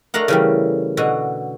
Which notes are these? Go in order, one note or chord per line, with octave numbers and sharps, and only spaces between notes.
A3 D4 A#4 F5 F#5
C#3 E3 G3
B2 D3 F#4